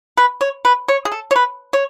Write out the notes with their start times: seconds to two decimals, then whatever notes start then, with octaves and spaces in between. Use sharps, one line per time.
0.17 B4
0.41 C#5
0.65 B4
0.88 C#5
1.05 G#4
1.12 A4
1.31 C#5
1.36 B4
1.73 C#5